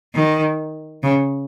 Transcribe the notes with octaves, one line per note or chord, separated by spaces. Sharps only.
D#3
C#3